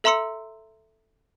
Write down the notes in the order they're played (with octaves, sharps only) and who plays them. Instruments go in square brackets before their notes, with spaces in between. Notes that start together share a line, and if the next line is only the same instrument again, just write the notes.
[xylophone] A4 E5 A#5 C6 E6 C#7